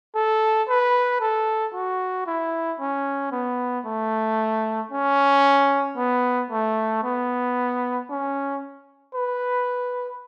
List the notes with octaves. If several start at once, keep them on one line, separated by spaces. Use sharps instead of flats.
A4
B4
A4
F#4
E4
C#4
B3
A3
C#4
B3
A3
B3
C#4
B4